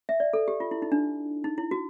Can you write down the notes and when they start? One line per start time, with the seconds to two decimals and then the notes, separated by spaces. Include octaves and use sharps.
0.09 E5
0.20 D5
0.33 A4
0.48 G4
0.60 F4
0.71 E4
0.82 D#4
0.92 D4
1.44 D#4
1.58 E4
1.71 F#4